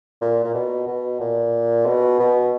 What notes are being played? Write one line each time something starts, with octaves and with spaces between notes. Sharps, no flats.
A#2
A#2
B2
B2
A#2
B2
B2